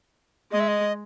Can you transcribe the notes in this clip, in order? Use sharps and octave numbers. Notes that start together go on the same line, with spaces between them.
G#3 D#5
E5
D#5